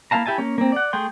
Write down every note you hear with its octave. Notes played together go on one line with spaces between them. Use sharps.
A#3 E4 F5 A5 A#5
E4 G4 E5 G#5 A5
A#3 C#4
A#3 C4
D5 F#5
A3 G#4 G5 C6